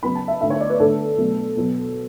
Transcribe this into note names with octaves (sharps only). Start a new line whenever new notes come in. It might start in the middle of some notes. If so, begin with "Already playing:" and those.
C#3 F#3 B3 B5
A5
E5
D3 A3 E5
C#5
D5
B4
D3 A3 A4
B2 F#3 A3
B2 F#3 B3